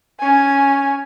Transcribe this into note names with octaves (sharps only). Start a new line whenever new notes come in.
C#4 G#5